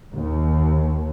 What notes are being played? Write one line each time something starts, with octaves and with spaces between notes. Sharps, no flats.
D#2